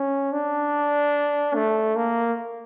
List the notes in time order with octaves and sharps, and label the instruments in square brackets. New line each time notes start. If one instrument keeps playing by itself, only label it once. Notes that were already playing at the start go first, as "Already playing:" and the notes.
Already playing: [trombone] C#4
D4
A3
A#3